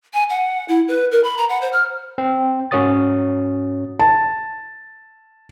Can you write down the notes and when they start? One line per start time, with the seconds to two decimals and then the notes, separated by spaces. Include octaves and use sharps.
0.14 G#5
0.30 F#5
0.68 E4
0.88 B4
1.11 A#4
1.24 B5
1.38 A#5
1.49 F#5
1.61 C5
1.73 F6
2.18 C4
2.71 G#2 C#4 F#4 C#5 D#6 A6
3.99 A5